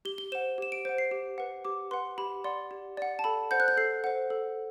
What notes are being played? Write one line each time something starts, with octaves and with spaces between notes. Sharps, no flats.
G4 G7
G7
C5 F#5 E7
G4 E7
D7
C5 F#5 D7
C7
G4
B4 F#5
G4 D6
B4 F#5 C6
G4 B5
D5 F#5 C6
G4
D5 F#5
A5
A4 B5
C5 F#5 G6
F#6
G6
A4 C7
C5 F#5
A4